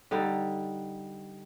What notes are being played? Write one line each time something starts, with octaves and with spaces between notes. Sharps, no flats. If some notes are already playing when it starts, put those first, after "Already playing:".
D3 G3 D#4